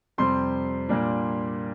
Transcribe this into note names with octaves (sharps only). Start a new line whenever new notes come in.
F2 C3 G3 C4 C6
A#2 G3 A#3 D4